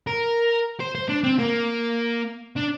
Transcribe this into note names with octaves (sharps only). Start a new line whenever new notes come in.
A#4
C5
C5
D4
C4
A#3
D4